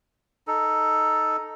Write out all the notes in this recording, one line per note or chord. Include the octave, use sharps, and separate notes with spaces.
D#4 A4